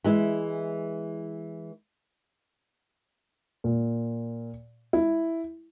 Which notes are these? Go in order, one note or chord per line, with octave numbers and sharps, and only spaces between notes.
E3 G#3 E4
A#2
E4